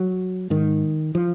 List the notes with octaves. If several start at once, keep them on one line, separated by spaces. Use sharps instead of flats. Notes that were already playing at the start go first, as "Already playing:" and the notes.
Already playing: F#3
G#2 D#3
F3